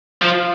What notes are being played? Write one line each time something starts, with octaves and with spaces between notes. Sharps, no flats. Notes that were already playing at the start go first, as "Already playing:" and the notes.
F3 F4